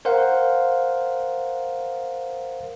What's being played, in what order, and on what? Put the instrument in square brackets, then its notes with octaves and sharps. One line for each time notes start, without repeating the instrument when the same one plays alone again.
[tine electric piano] A#4 C5 F5 F#5